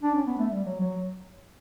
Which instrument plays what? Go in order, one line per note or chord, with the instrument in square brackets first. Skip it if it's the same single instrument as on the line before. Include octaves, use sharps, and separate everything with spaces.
[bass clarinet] D4
C#4
B3
A3
G3
F#3
F#3